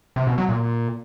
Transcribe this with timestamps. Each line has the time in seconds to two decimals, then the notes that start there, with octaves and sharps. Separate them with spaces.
0.16 C3
0.27 B2
0.38 F#3
0.49 A#2